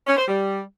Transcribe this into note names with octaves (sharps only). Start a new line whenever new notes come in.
C#4
C5
G3